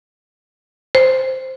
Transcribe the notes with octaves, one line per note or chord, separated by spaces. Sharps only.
C5